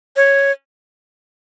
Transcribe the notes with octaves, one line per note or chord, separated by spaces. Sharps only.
C#5